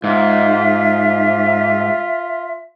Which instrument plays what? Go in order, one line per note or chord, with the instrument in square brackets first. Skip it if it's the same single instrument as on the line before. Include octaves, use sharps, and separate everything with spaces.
[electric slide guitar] G#2 [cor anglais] F4 [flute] E5